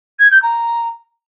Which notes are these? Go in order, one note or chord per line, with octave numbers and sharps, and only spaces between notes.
G#6
G6
A#5